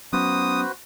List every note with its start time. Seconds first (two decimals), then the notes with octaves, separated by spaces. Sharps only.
0.13 F#3 B3 C#4 F#4 B4 C5 D#6